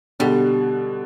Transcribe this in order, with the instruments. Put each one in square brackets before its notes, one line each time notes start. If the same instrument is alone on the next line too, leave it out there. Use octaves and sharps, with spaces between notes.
[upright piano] B2 D3 [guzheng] G3